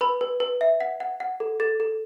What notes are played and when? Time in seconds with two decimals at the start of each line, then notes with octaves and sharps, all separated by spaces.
0.01 B4 B5
0.21 B4
0.40 B4
0.61 E5
0.80 F#5 B6
1.00 F#5
1.20 F#5
1.40 A4
1.60 A4 A6
1.80 A4